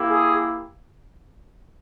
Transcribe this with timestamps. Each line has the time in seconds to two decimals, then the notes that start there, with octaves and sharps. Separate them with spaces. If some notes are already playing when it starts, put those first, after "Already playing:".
Already playing: A#3 E4 G4
0.09 G#4